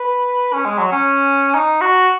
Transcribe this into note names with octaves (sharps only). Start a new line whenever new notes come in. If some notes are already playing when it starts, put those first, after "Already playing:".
Already playing: B4
C#4
G#3
F#3
C#4
D#4
F#4